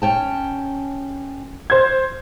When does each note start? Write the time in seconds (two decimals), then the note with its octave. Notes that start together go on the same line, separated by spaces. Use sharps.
0.02 C#4 G5 A5
1.70 C5 G#6